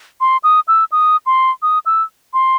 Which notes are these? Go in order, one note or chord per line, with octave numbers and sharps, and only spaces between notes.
C6
D#6
E6
D#6
C6
D#6
E6
C6